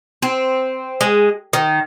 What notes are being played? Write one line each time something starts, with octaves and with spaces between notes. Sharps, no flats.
C4
G#3
D#3